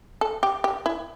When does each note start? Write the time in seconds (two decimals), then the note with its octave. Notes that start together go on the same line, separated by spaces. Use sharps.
0.21 A4
0.43 G4
0.64 G4
0.86 E4